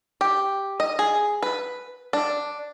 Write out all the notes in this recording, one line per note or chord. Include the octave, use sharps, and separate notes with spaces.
G4
D#5
G#4
B4
D4